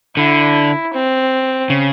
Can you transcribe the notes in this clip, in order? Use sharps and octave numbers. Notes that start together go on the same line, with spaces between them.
D3 E4
C4
C#3